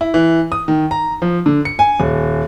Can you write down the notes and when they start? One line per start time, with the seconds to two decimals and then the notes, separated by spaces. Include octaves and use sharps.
0.01 E4
0.14 E3
0.52 D#6
0.68 D#3
0.91 A#5
1.22 F3
1.46 D3
1.65 C#7
1.79 G#5
2.00 D#1